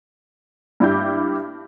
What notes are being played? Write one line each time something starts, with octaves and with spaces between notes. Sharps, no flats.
G2 G3 E4 G4 D6 G6